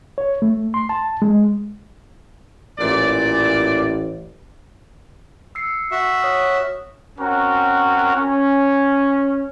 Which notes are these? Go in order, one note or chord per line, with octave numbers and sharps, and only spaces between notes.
C#5
A3
C6
A5
G#3
A1 A#2 E3 D5
E6 C7 C#7
F#4 E5
C#5 D#6 F6
C4 C#4 F#4 A#4 C#5
C#4